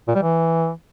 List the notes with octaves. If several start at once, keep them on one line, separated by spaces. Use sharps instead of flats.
A#2
G3
E3